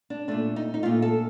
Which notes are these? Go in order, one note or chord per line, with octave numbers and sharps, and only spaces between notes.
D4
A#2 A3 D4
D#4
D#4
A#2 A3 F4
A4